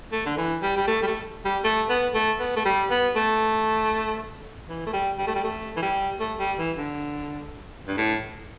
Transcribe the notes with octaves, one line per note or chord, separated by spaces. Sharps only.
A3
D3
E3
G3
G3
A3
G3
A3
G3
A3
B3
A3
B3
A3
G3
B3
A3
E3
A3
G3
G3
A3
G3
A3
E3
G3
A3
G3
E3
D3
G2
A2